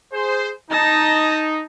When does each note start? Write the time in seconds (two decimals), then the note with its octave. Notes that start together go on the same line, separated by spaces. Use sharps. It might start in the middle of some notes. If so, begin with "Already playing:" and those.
0.13 G#4 C5
0.71 D#4 A5 A#6